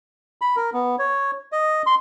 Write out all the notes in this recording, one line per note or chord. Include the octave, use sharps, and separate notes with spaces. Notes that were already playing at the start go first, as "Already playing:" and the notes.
B5
A#4
B3
C#5
D#5
C6